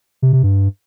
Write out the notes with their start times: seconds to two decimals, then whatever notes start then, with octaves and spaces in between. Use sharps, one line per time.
0.22 C3
0.33 C3
0.43 G2